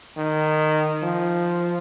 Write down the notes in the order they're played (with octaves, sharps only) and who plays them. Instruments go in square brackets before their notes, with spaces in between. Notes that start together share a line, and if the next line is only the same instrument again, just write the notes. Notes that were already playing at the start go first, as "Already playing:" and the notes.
[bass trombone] D#3
F3